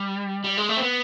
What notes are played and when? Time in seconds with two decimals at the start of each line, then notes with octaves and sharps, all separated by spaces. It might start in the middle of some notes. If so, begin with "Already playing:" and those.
Already playing: G3
0.44 G3
0.57 G#3
0.69 A3
0.77 C4
0.82 B3